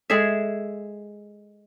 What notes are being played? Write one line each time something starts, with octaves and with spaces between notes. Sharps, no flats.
G#3 G#4 A4 E5